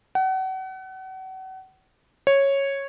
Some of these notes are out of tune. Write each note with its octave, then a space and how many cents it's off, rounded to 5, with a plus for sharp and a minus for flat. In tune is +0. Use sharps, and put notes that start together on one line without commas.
F#5 +35
C#5 -10